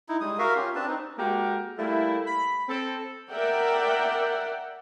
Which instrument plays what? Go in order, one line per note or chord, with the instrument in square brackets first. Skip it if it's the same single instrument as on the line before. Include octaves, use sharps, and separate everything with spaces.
[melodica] D#4 E4
G3 G#3 D#6
F#4 A#4 E5 F5
C#4 F4 G4
C4 D4 B4 A5
C4 D#4
[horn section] G#3 A#3 F#4 G4 A4 A#4
G3 A3 A#3 E4
B5
C4 A4
[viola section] A#4 D5 E5 F#5 G5